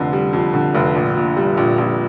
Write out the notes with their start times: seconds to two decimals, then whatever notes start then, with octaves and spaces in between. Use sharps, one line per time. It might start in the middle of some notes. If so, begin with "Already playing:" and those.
Already playing: F1 F2 D3
0.13 G3
0.33 F2
0.53 D3
0.74 F1
0.95 A#1
1.15 A#2
1.37 G3
1.57 A#1
1.78 A#1